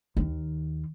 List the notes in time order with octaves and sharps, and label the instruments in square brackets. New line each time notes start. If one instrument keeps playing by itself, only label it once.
[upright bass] D#2 D#3